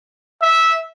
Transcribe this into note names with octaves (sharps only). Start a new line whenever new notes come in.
E5